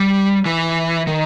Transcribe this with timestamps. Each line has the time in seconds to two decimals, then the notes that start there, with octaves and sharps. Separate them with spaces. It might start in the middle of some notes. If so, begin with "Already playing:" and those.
Already playing: G3
0.46 E3
1.07 D#3